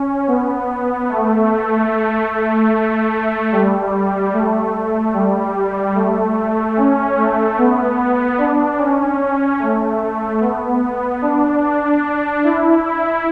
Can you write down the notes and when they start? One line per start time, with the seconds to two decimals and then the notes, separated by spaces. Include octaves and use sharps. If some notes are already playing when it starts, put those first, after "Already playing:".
Already playing: C#4
0.28 B3
1.09 A3
2.30 A3
3.52 G3
4.34 A3
4.74 A3
5.14 G3
5.95 A3
6.76 C#4
7.17 A3
7.57 B3
8.38 D4
8.78 C#4
9.59 A3
10.41 B3
11.22 D4
12.44 E4
12.84 E4